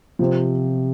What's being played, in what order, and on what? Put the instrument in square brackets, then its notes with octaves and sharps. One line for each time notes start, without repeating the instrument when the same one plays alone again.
[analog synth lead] C3 [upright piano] F3